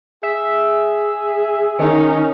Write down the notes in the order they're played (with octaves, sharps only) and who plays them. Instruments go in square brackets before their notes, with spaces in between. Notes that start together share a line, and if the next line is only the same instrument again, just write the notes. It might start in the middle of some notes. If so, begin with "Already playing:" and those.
[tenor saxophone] G#4 [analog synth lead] E5
[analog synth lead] D#3 [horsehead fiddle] C#4 D#4